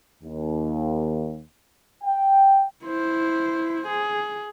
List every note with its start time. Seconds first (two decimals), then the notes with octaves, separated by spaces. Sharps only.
0.23 D#2
2.04 G5
2.85 E4 C5
3.88 G#4